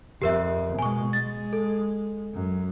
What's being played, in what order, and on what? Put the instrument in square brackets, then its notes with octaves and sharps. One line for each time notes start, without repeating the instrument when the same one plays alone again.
[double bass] F2 [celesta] G4 A#4 E5
[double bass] B2 G#3 [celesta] G#5 C#6
[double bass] G#3 [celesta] A6
[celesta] A4
[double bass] F#2